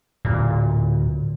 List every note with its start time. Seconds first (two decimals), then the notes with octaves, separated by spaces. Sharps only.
0.25 D1 A#2